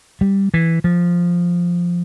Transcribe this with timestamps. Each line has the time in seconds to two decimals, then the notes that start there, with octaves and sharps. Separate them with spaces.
0.21 G3
0.54 E3
0.84 F3